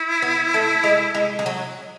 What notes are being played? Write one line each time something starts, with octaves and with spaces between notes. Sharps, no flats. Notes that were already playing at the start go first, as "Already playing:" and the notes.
Already playing: E4
B3
A3
G#3
G#3
G#3
F#3